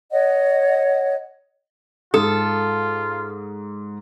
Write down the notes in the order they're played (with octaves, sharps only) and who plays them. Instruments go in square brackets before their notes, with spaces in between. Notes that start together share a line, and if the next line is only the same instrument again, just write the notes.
[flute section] C#5 D#5 F#5
[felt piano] G#2 D#6 [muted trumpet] F4 [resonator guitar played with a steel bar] A4